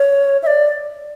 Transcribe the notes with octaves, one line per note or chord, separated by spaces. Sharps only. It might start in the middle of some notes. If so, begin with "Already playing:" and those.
Already playing: C#5
E5
D5